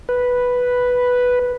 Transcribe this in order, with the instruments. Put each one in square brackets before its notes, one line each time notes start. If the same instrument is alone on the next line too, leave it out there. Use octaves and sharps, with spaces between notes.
[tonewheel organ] B4